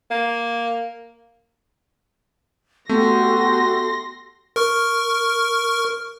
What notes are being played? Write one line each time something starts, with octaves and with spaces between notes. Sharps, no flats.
A#3
A3 B3 F#4 G4 A4 C6 A#6
A#4 C#6 F6